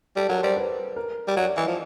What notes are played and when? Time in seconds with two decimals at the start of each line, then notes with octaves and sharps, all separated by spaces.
0.16 G3 A4
0.29 F#3 A#4
0.43 G3 C5
0.57 B4
0.96 A#4
1.28 G3
1.36 F#3 D5
1.57 E3 D#5
1.67 F3